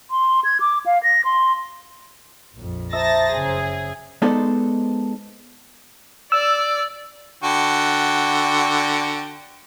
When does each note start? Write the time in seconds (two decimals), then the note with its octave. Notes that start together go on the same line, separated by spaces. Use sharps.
0.11 C6
0.44 G#6
0.60 D6
0.86 F5
1.03 A#6
1.25 C6
2.55 A#1 F2
2.93 C5 E5 A5 A#5 D#6 A6 A#6
3.33 F#1 C#3 G#4
4.22 G#3 B3 D#4 A4 C5 D5
6.32 D5 E6
7.44 D3 F#4 G5